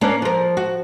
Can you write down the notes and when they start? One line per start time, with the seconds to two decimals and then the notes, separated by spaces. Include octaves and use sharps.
0.01 A#3 C#4 D4
0.22 F3 A#4
0.57 F#4